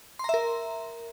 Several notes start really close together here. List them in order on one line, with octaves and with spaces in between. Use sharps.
C6 A#5 E5 A#4